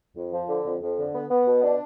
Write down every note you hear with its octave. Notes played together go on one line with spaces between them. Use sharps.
F2
F3
D3
F2
F2
D3
B3
B3
B2
D4